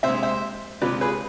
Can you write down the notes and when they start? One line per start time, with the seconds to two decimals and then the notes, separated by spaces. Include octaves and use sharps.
0.03 C3 C5 E5
0.08 G#3
0.23 C5 E5
0.81 C3 F3 G#3 B4 D5
1.01 G#4 B4